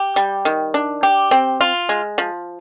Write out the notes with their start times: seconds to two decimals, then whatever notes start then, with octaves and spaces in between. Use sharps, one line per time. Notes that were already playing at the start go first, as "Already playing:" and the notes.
Already playing: G4
0.16 G3
0.45 D#3
0.74 D4
1.03 G4
1.31 C4
1.61 F4
1.89 G#3
2.18 F3